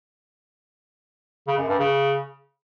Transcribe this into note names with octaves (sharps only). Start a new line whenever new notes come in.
C#3
F#2
G2
C#3